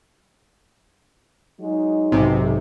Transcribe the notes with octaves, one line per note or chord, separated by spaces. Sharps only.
F#3 G#3 D#4
B1 G#2 C3